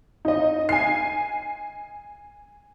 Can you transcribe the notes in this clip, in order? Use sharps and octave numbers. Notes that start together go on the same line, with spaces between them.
D#4 D#5
G#5 C7